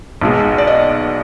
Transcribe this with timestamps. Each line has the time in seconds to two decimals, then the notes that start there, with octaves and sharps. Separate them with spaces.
0.21 B1 B2 G#3
0.58 D5
0.67 D#5